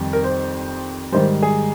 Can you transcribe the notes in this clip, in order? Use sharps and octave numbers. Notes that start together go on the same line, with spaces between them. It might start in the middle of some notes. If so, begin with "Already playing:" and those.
Already playing: F2 D#3 G3
A#4
C5
G#2 D#3 G3 C5
G#4